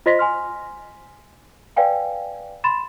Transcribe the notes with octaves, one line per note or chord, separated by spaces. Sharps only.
F4 C5 D#5 C6 A#6 B6
G#5 C6 F6
B4 D5 F5 G5 G#5
B5 C6 A6 E7